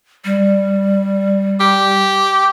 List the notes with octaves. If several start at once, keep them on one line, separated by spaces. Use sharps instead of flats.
G3
G4